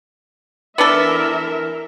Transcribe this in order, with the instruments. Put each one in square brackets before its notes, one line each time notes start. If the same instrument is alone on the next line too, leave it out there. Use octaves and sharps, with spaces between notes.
[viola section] E3 A#4 E5 [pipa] B3 D4 A4